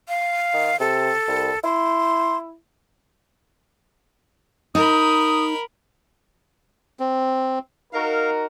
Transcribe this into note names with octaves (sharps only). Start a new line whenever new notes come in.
F5
D#3
C3 A4
C2
E4 C6
D#4 A#4 B5 D#6
C4
D#4 F#4 A#4 F5